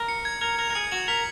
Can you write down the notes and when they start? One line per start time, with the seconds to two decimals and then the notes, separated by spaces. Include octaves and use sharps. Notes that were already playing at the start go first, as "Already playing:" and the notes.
Already playing: A#4
0.08 C#7
0.25 G#6
0.41 A#4 G#6
0.59 A#4 F7
0.70 A#4
0.75 G#4 C#7
0.91 F#4 F#7
1.08 A#4 B6